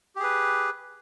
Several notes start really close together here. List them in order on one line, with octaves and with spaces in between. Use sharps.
G4 G#4 B4